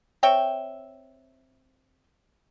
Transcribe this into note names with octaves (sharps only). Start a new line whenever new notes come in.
C4 C#5 E5 G5